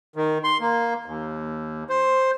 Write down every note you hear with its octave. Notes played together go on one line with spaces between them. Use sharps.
D#3
C6
A#3
D#2
C5